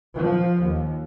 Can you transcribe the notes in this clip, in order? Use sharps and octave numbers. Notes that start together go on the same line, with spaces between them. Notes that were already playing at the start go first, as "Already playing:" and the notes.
F3
D#2